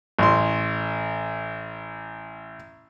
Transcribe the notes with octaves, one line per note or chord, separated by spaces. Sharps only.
A1 C6